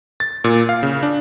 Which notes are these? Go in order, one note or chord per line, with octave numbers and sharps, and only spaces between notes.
A6
A#2
F5
C#3
D4